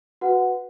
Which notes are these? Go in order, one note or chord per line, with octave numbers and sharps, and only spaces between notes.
F#4 B4 F#5